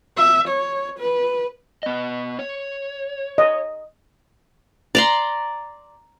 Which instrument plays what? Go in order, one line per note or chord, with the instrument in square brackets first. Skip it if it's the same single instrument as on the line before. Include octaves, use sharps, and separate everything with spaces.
[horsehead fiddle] E5
C#5
B4
[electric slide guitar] B3 D#5
C#5
[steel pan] D#5
[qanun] D5 A#5 C6